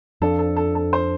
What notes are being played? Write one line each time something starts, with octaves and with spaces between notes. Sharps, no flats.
F2 F3 D4 A4
A4
A4
A4
C5